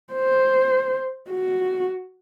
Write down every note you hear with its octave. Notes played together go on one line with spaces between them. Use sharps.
C5
F#4